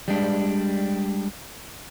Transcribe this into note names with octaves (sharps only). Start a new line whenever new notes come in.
G3 G#3 D4